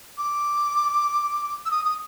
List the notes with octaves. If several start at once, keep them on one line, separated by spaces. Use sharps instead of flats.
D6
E6
D#6
D#6